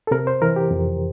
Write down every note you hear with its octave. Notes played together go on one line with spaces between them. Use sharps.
A4
C3 A#4
C5
E3 A#4
G4
F2